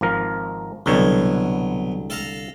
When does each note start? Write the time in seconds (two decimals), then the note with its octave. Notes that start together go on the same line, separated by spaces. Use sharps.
0.01 G#1 F3 A#4
0.86 C2 B2 D3 F#3 C#5
2.10 A4 F5 A#5